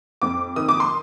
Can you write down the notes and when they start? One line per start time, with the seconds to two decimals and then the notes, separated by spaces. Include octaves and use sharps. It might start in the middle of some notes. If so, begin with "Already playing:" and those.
0.22 F2 D6
0.56 D#3 D#6
0.69 D6
0.80 C6